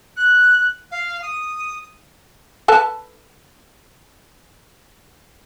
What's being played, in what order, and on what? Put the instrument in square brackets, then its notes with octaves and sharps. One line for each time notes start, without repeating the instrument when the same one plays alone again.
[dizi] F#6
F5
D#6
[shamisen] A4 B4 A5